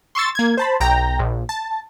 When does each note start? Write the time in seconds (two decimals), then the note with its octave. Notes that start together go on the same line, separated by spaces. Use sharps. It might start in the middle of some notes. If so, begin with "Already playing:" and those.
0.15 C6 C#6 E6 A6
0.35 A#3 G#6
0.57 C5 A5 B5
0.80 B1 G5 A#5
1.19 A#1
1.49 A5